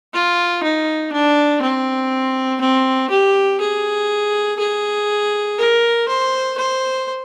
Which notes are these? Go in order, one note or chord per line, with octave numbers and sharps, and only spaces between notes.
F4
D#4
D4
C4
C4
G4
G#4
G#4
A#4
C5
C5